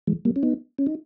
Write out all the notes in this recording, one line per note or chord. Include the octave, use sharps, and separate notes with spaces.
E3 G#3
G3 A#3
C#4
B3 D#4
C#4
D#4